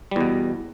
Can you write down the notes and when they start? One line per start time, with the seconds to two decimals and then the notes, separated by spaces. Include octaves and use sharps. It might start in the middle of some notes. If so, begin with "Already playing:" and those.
0.11 G3
0.16 E2
0.21 B2